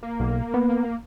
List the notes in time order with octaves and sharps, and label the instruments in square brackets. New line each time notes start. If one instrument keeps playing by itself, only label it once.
[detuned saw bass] A#3
[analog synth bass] B1
B3